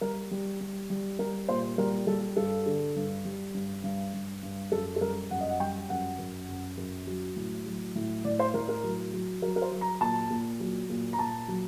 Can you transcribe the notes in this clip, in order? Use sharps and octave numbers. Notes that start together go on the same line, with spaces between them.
G3 A#4
G3
G3
G3
G3 A#4
A#2 C5
G3 A#4
G3 A4
G2 A4
D3
G2
G3
G2
G2
G2
G2
F#2 A4
A4
G3 A#4
F#2 F#5
D#5
F#5
G3 G5
F#2 F#5
F#2
F#2
F#2
F#3
A2
F#3
A2
A2 D5
C5
A2 A#4
A#4
F#3
F#3
F#3 A#4
A#4
C5
F#3
A#5
A#2 A5
A#2
F#3
A#2
A#5
A#2 A5
F#3